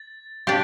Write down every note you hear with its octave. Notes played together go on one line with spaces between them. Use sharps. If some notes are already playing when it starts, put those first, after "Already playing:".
Already playing: A6
D4 G4 G6